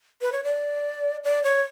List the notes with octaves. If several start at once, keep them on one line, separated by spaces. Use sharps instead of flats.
B4
C#5
D5
D5
C#5